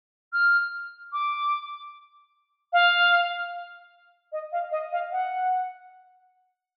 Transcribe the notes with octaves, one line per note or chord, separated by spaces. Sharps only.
F6
D6
F5
D#5
F5
D#5
F5
F#5